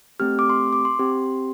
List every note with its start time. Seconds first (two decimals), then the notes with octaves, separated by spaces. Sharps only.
0.20 A3 C4 G4 F6
0.39 D6
0.50 C6
0.73 D6
0.85 C6
0.99 C4 G4